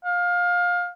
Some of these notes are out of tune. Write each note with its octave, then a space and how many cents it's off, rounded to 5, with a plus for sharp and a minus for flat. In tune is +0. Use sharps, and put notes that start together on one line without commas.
F5 +20